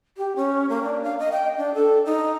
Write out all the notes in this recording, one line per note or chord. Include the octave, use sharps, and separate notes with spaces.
G4
C#4
A#3
D4
F5
D#5
G5
D4
A4
D#4